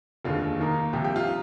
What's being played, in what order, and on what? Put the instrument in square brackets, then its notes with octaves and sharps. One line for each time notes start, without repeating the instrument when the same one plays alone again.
[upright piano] F1 D#2 D3 G#3 F4
D#2 D#3 A#3 D#4
C2 C3 F3 G4
G4
F4
D#4